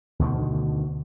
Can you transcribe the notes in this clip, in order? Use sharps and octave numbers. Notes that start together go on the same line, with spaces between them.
D2 B2 D3 D#3